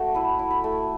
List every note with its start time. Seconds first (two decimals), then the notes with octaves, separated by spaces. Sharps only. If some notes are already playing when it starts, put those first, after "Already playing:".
Already playing: A3 F#4
0.14 E4 B4
0.39 E4
0.51 B5
0.64 A3